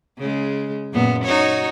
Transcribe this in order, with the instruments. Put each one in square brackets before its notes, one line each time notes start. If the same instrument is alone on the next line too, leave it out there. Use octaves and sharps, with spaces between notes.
[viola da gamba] C#3 G#3
F#2 A#2 B3
D#4 F#4 C#5